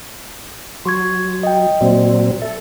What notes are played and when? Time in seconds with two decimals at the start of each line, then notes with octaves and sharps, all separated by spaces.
0.85 F#3 C6 C#6 G#6
1.43 D#5 G5
1.81 A#2 F#3 C4 D5
2.42 A4 E5